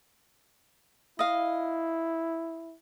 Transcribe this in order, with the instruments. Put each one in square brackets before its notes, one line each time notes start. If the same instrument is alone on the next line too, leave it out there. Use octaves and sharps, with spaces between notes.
[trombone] E4 [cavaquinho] D#5 F5